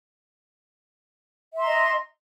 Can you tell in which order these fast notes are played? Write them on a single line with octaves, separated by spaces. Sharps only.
E5 C6 A#5 D#5